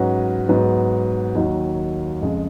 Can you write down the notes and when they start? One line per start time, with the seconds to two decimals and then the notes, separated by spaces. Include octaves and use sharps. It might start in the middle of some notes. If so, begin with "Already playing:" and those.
Already playing: G#2 F#3 C#4 F#4 B4
0.48 G#2 F#3 B3
1.35 D#2 D#3 F#3
2.21 F2 C#3 G#3